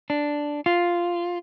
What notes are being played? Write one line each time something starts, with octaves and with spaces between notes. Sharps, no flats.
D4
F4